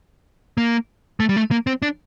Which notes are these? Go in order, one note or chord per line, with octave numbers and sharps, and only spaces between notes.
A#3
A3
G3
A3
A#3
C4
D4